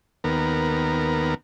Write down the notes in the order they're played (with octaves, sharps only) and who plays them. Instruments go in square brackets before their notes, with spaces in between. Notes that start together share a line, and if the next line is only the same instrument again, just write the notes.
[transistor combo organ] D#2 B3 A#4